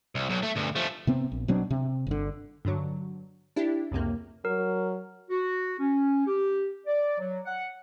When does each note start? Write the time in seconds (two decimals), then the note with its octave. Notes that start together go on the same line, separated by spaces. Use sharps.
0.15 C2
0.30 B1
0.43 A3
0.56 D2 G2
0.76 F3 A3
1.07 C3 B3 C4
1.32 A#1
1.48 B2 F#3 C4 D4
1.70 C3
2.07 G1 D3
2.65 G2 D3 F#3
3.56 D4 E4 G4
3.91 C#2 F#2 C3 A#3
4.45 F#3 A#4
5.30 F#4
5.80 C#4
6.27 G4
6.86 D5
7.19 F#3
7.45 F#5